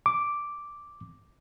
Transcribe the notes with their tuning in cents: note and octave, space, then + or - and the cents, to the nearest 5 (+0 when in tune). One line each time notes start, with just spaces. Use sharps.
D6 -5